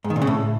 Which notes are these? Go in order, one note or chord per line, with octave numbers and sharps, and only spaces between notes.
G#2
D#3
A#2
C#3
A2